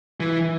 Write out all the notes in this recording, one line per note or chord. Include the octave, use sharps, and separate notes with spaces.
E3